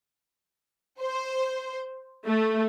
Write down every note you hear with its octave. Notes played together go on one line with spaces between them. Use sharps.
C5
A3